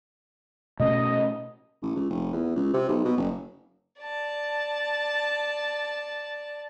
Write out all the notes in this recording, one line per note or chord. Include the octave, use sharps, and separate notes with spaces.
B2 A3 C#4 D#5
A1
C#2
F1
E2
C#2
C3
B1
B2
F#1
D5 A5